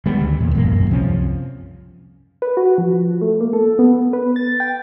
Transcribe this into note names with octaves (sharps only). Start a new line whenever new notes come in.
D#3 G3 G#3 B3
D2
E2 A#2
E1 A1 F#2 A#3
F#2 A#2
C2 F3 C4 C#4
B4
F#4
F3
A3
A#3
A4
B3
B4
A6
G5